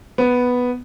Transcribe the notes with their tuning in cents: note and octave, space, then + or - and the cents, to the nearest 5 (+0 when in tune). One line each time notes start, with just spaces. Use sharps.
B3 +0